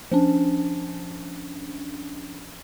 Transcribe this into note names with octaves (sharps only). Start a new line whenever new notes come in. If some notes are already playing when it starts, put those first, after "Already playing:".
F3 C#4 D4